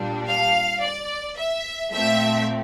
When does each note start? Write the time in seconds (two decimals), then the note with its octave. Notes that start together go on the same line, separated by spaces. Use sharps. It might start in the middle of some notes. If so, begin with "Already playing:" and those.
Already playing: A#2 G3 D4
0.26 F5
0.81 D5
1.36 E5
1.92 A#2 A3 C4 E5